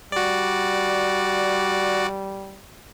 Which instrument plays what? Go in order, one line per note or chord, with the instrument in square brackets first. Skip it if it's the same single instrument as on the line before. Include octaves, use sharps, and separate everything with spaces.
[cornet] G3 [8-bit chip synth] F#4 D5